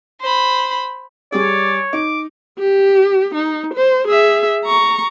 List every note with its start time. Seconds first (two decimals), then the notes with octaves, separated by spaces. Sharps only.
0.21 C5 B5
1.32 G3 G#4 C#5 D5
1.93 D#4 D6
2.59 G4
3.35 D#4
3.74 C5
4.08 G#4 E5
4.65 A#5 C#6